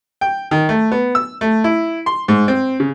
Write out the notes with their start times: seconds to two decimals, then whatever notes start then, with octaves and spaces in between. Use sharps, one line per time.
0.21 G5
0.51 D#3
0.69 A3
0.92 B3
1.15 E6
1.41 A3
1.64 E4
2.06 C6
2.28 G#2
2.48 C4
2.80 C#3